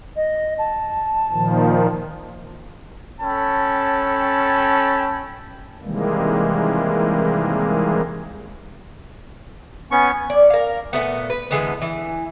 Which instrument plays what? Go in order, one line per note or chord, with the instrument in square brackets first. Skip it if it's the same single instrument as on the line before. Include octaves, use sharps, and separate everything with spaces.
[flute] D#5
A5
[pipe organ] A#2 D#3 F3
[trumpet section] C#4 A4 G5 A5 B5
[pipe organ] C3 D#3 E3 G3 G#3 A#3
[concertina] B3 C#4 C#6 [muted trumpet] G#5
[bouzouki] D5
A#4 F5
A#2 F#3 A3 B3
B4
D3 E3 G#3 B3
E3